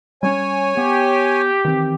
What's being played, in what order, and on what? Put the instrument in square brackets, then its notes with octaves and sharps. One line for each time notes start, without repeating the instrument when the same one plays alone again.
[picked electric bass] G3 B3 C#4 [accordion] C#5 G#5
[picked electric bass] B3 [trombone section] G4
[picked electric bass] D#3 E3 C4